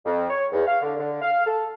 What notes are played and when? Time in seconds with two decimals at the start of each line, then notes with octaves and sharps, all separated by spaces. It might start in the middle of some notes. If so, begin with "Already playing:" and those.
0.05 F2
0.29 C#5
0.52 E2
0.67 F5
0.82 D3
0.98 D3
1.22 F5
1.46 A4